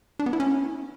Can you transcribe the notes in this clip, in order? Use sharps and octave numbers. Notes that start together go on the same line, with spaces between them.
D4
B3
E4
C#4